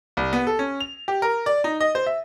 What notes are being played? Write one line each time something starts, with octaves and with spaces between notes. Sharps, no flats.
C2
B3
A4
C#4
F7
G4
A#4
D5
D#4
D#5
C5
E5